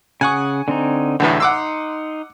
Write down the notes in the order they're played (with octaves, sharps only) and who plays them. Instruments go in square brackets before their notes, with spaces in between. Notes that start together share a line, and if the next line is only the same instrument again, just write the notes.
[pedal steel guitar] C#3 F#5 D#6 [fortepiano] G#5 C#6
[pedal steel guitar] D3 C4 D#4
[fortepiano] B1 E2 A2 [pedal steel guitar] D3 B4
[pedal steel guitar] D#4 C6 [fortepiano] F#5 D6 E6